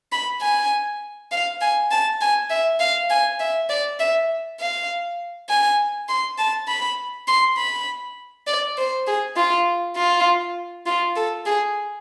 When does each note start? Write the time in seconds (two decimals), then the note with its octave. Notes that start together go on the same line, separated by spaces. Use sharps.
0.12 B5
0.41 G#5
1.31 F5
1.61 G#5
1.91 A5
2.21 G#5
2.50 E5
2.80 F5
3.10 G#5
3.40 E5
3.69 D5
3.99 E5
4.60 F5
5.49 G#5
6.08 C6
6.38 A5
6.68 B5
7.28 C6
7.57 B5
8.47 D5
8.77 C5
9.07 G#4
9.36 F4
9.96 F4
10.86 F4
11.16 A4
11.46 G#4